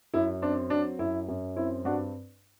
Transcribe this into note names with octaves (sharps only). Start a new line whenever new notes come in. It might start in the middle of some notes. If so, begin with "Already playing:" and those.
F#2 E4
C4 D4
F#3 D4
F#2 E4
F#2
C4 E4
G2 D4 F#4